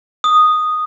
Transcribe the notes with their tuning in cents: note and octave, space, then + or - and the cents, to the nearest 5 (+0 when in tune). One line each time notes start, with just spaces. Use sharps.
D#6 -5